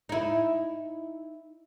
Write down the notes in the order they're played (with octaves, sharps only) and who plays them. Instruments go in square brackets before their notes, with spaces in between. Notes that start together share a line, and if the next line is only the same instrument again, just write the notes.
[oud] D#4 E4